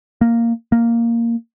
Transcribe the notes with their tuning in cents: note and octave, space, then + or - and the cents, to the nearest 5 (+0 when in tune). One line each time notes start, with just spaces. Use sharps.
A#3 -5
A#3 -5